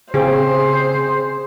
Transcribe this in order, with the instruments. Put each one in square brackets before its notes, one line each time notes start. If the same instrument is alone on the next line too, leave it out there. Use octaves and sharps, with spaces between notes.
[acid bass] C#3 [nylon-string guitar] C4 G4 [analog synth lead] G#4 [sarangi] C5